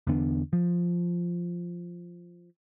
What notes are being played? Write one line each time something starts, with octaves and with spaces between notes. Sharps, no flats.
E2 D3 B3 D4
F3